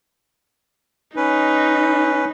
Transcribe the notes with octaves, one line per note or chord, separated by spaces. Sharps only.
C#4 D#4 B4